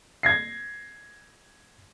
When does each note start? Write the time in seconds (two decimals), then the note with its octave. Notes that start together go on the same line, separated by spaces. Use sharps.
0.23 G#6 A#6 C7